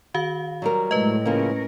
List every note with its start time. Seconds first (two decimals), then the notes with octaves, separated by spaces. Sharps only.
0.14 D#3 F#4 F5
0.62 F#3 G3 A#4
0.91 A2 G#3 A3 B4 D#5
1.25 C#3 F3 A#3 C#4 A#4